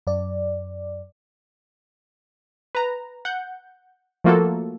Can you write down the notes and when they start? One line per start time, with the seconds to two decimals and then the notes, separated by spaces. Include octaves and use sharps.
0.07 F#2 D5
2.75 B4 A#5
3.25 F#5 G6
4.24 F3 A3 A#3 F4 F#4 A4